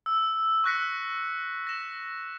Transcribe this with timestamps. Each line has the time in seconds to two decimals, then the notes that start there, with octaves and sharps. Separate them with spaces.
0.06 E6
0.64 C#6 E6 F#6 A#6 B6 C#7
1.67 A#6 E7